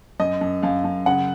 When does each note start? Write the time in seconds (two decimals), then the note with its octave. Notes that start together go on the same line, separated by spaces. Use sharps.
0.20 F#2 D#5
0.41 F#2
0.63 F#2 F5
0.84 F#2
1.06 C#3 F#5